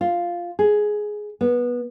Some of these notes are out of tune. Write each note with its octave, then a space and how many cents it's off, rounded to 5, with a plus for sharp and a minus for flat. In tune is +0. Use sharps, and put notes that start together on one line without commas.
F4 +0
G#4 +10
B3 -20